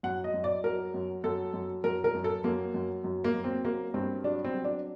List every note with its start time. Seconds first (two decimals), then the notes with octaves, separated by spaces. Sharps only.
0.03 F#2 F#5
0.24 D#5
0.34 F#2
0.44 D5
0.64 F#3 A#4
0.94 F#2
1.24 F#2 A4
1.54 F#2
1.84 F#2 A#4
2.04 A#4
2.14 F#2
2.24 A4
2.44 F#2 A#3
2.74 F#2
3.04 F#2
3.24 A#3
3.34 F#2
3.44 C4
3.64 F#3 A#3
3.94 G2 C4
4.24 F#3 D4
4.45 C4
4.54 F#3
4.64 D4